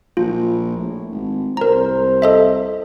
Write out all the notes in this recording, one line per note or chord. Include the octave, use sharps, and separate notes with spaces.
A#1 F4
A2
G#1
C2 A#4 C5 A#5
A4 D#5 E5